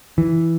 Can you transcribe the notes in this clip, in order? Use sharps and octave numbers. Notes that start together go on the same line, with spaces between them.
E3